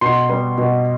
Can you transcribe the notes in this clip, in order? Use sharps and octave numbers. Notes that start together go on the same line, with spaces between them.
B2 C6
G3 B3
B2